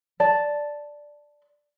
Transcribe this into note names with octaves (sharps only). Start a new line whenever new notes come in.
D5 A5